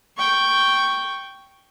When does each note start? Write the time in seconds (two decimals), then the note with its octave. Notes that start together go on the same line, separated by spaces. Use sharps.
0.17 G5 C#6